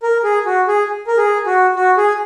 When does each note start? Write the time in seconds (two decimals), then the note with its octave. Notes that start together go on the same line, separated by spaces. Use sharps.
0.03 A#4
0.24 G#4
0.46 F#4
0.68 G#4
1.07 A#4
1.18 G#4
1.46 F#4
1.76 F#4
1.97 G#4